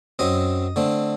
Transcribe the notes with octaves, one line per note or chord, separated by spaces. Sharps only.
F#2 F#3 C4 D#5
D3 A3 C4